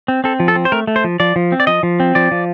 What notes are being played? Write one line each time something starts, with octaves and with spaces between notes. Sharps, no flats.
C4
C4 A4
F3
A4
C4
C5
A3 A#4
A3
C5
F3
F3 D5
F3
C4
D5
F3 D#5
F3
C4
F3 D5
F3